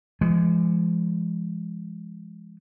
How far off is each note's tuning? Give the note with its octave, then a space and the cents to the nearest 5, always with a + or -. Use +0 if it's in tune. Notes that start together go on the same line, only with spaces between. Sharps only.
F3 -40 G#3 +0